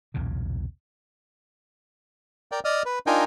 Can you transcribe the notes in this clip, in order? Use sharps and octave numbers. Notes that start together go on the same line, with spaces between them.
B1 E2 A#2 C#3
A#4 D5 G5
D5 D#5 D#6 F6
B4
D4 D#4 F4 A#4 G5 G#5